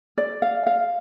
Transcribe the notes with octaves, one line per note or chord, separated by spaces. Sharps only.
D5
F5
F5